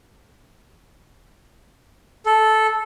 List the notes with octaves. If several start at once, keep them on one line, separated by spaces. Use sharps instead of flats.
A4